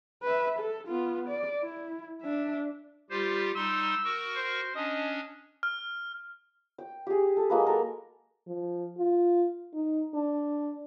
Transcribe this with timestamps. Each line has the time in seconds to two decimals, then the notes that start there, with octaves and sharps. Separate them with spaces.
0.23 B4 E5
0.59 A4
0.88 B3 F4
1.28 D5
1.61 E4
2.22 D4 E5
3.10 G3 F4 G4 C5
3.55 G3 D#4 C6 E6
4.04 F#4 A#4 C#6
4.36 C5
4.75 C#4 D4 D#5
5.63 F6
6.78 G5
7.07 G4 G#4
7.37 A4
7.50 F#3 G#3 A#3 B4
7.66 A4 A#4
8.47 F3
8.98 F4
9.74 D#4
10.14 D4